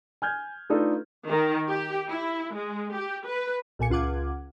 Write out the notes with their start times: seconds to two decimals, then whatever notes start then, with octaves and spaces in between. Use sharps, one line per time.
0.22 G#5 F6 G6 G#6
0.70 A3 D4 D#4 F4 A4 B4
1.28 D#3
1.70 G4
2.10 E4
2.54 G#3
2.95 G4
3.27 B4
3.79 B1 A#2 G#5 C#7
3.90 C#2 F4 F#5 D6 G#6